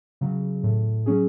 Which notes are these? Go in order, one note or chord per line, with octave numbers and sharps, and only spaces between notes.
C#3 F#3
A2
F#3 C#4 G#4